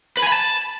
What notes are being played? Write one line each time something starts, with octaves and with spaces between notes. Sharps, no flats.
B4
G#5
B5
A5